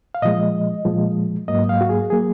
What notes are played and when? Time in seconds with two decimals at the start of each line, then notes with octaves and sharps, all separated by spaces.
0.15 F5
0.22 A#2 F3 G#3 D#5
0.85 A#2 F3 G#3
1.48 G#2 F#3 A#3 D#5
1.69 F5
1.81 F#4
1.89 G#4
2.10 F#3 A#3 G#4